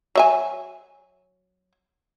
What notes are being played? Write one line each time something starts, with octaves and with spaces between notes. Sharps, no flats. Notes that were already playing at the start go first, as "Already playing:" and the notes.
F#3 E5 G#5